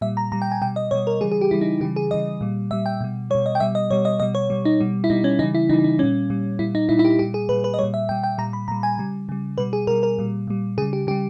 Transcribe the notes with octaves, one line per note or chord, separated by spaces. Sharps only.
A#2 G3 E5
A#5
A#2 G3 A#5
G5
G#5
B2 G3 G5
D#5
B2 G3 C#5
A#4
C#3 E3 G3 G#4
G#4
G4
C#3 E3 G3 E4
D#4
C#3 E3 G3 G4
G#4
C#3 E3 G3 D#5
A#2 G3
A#2 G3 E5
G5
B2 G3
B2 G3 C#5
D#5
G5
B2 G3 E5
D#5
B2 G3 C#5
D#5
B2 G3 D#5
C#5
B2 G3
D#4
B2 G3
E4
B2 G3 D#4
C#4
C#3 E3 G3 D#4
E4
C#3 E3 G3 D#4
D#4
A#2 G3 C#4
A#2 G3
A#2 G3 E4
D#4
A#2 G3 E4
E4
G4
A#2 G3 G4
G#4
A#2 G3 B4
B4
D#5
A#2 G3 C#5
E5
A#2 G3 G5
G5
A#2 G3 A#5
B5
A#2 G3 A#5
G#5
C#3 G3
C#3 G3
B2 G3 B4
G#4
B2 G3 A#4
A#4
A#2 G3
A#2 G3
C#3 G3 G#4
G4
C#3 G3 G4